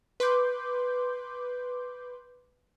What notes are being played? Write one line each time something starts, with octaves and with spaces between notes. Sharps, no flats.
B4 C6 D6 G6